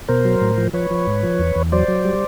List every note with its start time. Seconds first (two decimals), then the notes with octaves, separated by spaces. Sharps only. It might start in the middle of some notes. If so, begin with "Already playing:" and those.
0.09 B2 A#4 C5
0.25 F#3
0.41 A2
0.58 F3
0.73 F3 B4 C#5
0.91 F3
1.07 G#2
1.23 F3
1.39 E2
1.56 E2
1.72 F#3 C5 D5
1.88 F#3
2.05 G3